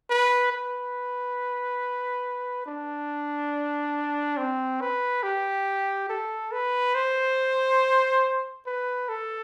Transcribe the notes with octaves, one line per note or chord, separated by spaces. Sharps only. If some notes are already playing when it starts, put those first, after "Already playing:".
B4
B4
D4
C4
B4
G4
A4
B4
C5
B4
A4